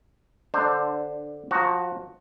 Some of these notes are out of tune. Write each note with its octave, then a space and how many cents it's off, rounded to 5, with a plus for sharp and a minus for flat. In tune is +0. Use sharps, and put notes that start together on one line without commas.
D3 +0 D4 +20 C5 +0
F3 +25 F#4 +5 A#5 +0